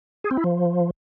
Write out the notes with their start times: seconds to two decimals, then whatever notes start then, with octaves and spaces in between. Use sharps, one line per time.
0.24 G#4
0.31 C4
0.37 E4
0.44 F3